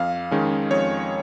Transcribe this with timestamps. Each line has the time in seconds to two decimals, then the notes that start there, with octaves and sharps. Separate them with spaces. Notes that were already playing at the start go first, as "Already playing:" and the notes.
Already playing: F2 F5
0.31 D#3 G#3 C#4
0.71 F2 C#5